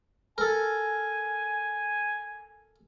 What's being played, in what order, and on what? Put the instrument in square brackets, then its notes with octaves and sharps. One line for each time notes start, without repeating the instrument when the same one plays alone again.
[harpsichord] A4 A#4 [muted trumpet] G#5